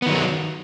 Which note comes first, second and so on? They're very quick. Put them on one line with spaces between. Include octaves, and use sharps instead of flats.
B3 D#3 F#3